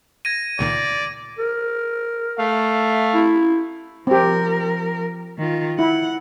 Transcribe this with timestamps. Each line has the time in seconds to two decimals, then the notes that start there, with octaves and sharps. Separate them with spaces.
0.25 G#6 A#6 D#7
0.59 C#2 A#2 D#3 D5
1.39 A#4
2.40 A3 E5 F5
3.14 E4
4.07 F3 C4 G4 A#4
5.38 D#3 F4
5.79 E4 F#5